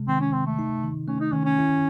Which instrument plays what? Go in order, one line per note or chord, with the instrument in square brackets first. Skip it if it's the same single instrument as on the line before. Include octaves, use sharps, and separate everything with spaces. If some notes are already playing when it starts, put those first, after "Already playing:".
Already playing: [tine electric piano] C3 G#3
[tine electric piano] D#3 [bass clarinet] C4
[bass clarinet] C#4
[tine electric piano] C3 [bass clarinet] C4
[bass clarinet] A3
[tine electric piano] D#4
D#3
[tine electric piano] A3 [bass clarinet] C#4
[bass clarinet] D#4
[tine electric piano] D#3 [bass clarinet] C#4
[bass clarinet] C#4
[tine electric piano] E4